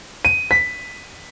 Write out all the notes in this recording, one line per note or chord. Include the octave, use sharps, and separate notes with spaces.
D#7
B6